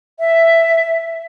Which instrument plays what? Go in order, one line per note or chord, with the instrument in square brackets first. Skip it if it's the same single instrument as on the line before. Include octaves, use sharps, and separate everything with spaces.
[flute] E5